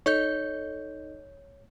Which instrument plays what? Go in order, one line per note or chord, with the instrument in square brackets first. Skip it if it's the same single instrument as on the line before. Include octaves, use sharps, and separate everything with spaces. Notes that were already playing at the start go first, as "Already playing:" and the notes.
[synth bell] D#4 A4 D#5 [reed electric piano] C#5 G6